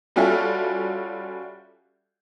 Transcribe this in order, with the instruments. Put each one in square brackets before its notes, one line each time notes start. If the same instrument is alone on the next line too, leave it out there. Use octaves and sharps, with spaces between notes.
[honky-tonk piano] G3 C#4 F4 F#4 A4 E5